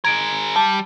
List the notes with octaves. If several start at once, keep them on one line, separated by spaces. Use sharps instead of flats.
G#4 A#4 G#6 D7
G3 A5